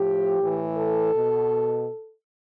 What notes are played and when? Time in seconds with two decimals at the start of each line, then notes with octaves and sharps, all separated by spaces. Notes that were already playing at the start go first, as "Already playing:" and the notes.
Already playing: A2 F3 G4
0.39 A2 E3
0.76 A4
1.14 B2